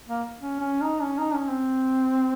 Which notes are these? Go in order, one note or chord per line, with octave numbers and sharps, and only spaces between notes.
A#3
C#4
C#4
D#4
C#4
D#4
C#4
C4